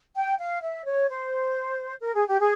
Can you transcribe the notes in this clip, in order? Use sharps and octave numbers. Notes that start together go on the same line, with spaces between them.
G5
F5
E5
C#5
C5
A#4
G#4
G4
G#4